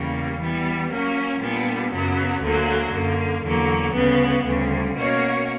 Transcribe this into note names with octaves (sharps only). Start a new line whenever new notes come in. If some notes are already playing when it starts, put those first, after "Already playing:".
Already playing: E2 C#3 G3 A#3
E3 G3 B3
F#3 A#3 C#4
A#2 G3 B3 D4
F#2 C#3 F#3 B3
D2 D3 F#3 A#3
F#2 D3 A#3
E2 D3 F#3 A#3
D2 C#3 G3 B3
D2 C#3 G3
B2 A#3 C#4 F#4 C#5